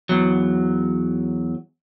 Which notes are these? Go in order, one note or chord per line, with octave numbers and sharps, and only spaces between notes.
E2 F#3